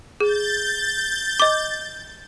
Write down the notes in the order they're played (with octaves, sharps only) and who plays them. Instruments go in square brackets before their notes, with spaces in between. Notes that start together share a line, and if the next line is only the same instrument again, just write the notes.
[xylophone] G#4 [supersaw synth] G6 A6
[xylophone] D#5 D6